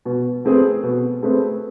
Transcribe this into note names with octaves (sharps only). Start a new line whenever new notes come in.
B2
A3 C4 G#4 B4
B2
A3 C4 G#4 B4